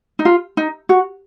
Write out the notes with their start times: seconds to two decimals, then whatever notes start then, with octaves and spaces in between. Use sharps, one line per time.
0.19 D#4
0.25 F4
0.57 D#4
0.89 F#4